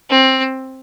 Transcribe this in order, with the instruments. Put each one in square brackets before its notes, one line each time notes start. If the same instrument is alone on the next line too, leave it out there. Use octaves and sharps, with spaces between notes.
[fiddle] C4